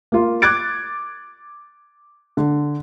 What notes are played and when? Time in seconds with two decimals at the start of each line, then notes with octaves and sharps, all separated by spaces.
0.12 A#3 F4
0.42 D6 F#6 G#6 A6 D7
2.37 D3